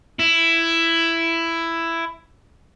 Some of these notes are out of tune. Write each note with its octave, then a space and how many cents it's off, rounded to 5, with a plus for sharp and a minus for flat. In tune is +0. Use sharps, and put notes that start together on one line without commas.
E4 +10